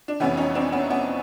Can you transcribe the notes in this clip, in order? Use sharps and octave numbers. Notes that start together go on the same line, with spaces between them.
D4
F1 F2 C3 E3 B3 C#4
C#4 D#4
C4 D4
B3 C#4
B3 C#4